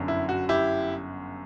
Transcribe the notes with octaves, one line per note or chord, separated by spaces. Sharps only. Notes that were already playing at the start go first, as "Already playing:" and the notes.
Already playing: G1 F#2 D3
E4
F#4
E4 G4